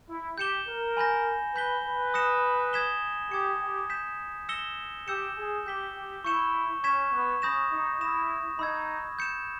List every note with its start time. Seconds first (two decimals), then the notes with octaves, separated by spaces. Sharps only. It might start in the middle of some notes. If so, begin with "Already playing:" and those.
0.09 E4
0.38 G4 G6 C#7 E7 G7
0.68 A#4
0.97 G#5 B5 G6 A#6
1.55 B4 B5 G6 B6 G7
1.85 B4
2.14 D#6 A#6 C#7 E7
2.73 D#6 G#6 B6 E7 G7
3.31 G4 D#6 G#6 C#7
3.60 G4
3.90 G6 B6 E7
4.49 E6 A#6 C#7 E7 G7
5.08 G4 E6 G6 C#7 E7
5.37 G#4
5.66 G4 G6 B6 G7
5.95 G4
6.24 E4 C#6 G6 C#7 E7 G7
6.83 C#4 C#6 G#6 B6 E7
7.13 B3
7.42 C#4 B5 D#6 G6 A#6 E7
7.72 D#4
8.00 E4 D#6 A#6 E7
8.59 D#4 B5 E6 G#6
9.19 G6 C#7 E7